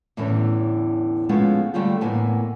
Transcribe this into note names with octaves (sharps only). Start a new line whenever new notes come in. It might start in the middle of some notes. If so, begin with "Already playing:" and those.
E2 A2 D3 E3 C#4
F3 G#3 A3 B3 C#4 F4
D3 G3 A3 F4 G4
E2 A2 A#3 B3 G#5